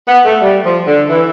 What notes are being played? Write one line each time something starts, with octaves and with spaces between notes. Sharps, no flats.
B3
A3
G3
F3
D3
E3